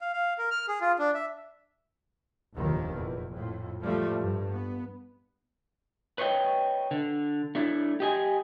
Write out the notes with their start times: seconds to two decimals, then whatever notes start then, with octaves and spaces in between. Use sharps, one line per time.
0.01 F5
0.13 F5
0.38 A#4
0.51 F6
0.68 G#4
0.81 F4
0.99 D4
1.15 E5
2.55 F1 A#1 D#2 D#3 F3
2.94 E2
3.31 F2 A2
3.82 A2 F3 G3 A3
4.19 G2
4.50 B3
6.18 B4 C#5 D#5 G5
6.91 D3
7.55 A3 D4 E4
8.00 G4 D#5 G#5